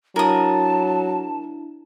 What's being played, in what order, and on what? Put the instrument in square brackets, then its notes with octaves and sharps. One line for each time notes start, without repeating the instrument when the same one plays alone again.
[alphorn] F#3 [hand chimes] D4 E4 [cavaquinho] A#4 D#6 [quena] A5